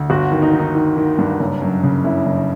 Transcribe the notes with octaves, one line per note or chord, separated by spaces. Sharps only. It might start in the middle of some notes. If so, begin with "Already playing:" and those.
Already playing: D2
G1 F#4
D#3
D#4
D#3
D#4
D#3
D#3
G2
F#1
F#2
C#3
F#1 E4
F#1